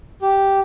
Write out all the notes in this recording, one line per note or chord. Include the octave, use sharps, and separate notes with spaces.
G4